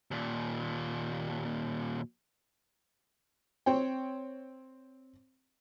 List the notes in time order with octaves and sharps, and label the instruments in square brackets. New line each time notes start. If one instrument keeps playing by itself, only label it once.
[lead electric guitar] D#2 A#2
[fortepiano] C4 C#5 G5